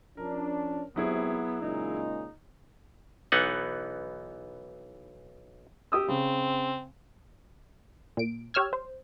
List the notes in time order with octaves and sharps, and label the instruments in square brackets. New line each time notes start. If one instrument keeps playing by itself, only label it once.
[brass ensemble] F3 C#4 D4 [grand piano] A#4
[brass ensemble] G#1 C3 [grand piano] F#3 E4 G#4 [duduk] B3
[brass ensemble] A#2 C#3 G#3 [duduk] D#4
[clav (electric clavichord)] B1 E3 B3 D#4 F#5
[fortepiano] G4 D#6 E6
[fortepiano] C#3 [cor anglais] C4
[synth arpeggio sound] A#2 D7
G4 C#5 E6 F6 G#6
C5